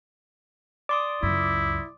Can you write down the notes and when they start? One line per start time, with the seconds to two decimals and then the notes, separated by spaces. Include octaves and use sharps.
0.89 D5 C6 D6 D#6
1.23 C#2 F#2 E4